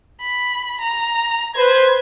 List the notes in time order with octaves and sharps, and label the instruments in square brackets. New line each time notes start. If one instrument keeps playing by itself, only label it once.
[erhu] B5
A#5
[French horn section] B4 C5 [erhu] G#6